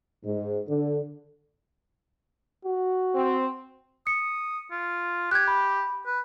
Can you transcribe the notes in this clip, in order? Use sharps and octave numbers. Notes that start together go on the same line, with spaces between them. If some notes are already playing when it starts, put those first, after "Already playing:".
G#2
D3
F#4
C4
D#6 C#7
F4
G4 F#6 G#6
B5
B4